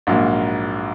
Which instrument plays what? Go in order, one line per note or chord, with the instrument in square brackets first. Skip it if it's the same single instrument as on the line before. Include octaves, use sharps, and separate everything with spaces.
[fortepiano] A#1 G#2 F#3 A#3